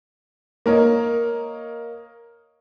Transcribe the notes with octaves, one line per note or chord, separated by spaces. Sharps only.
A#3 A#4 C#5 D#5